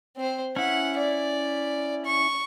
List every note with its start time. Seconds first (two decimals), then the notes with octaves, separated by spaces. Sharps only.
0.17 C4 C5
0.56 C#4 E4 F#5
0.97 D5
2.05 C#6